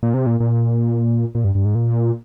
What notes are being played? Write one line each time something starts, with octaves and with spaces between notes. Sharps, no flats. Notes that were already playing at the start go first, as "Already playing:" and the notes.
A#2
C3
A#2
A#2
A#2
G2
G2
G#2
A#2